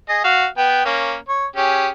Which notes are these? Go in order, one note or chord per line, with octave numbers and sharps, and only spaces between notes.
G#4 D#5
F#4 F5
B3 G5
A#3 C#4
C#5
C#4 G4 G#4